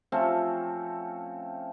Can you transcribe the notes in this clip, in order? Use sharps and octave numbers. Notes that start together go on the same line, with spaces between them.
F3 A3 C4 C#4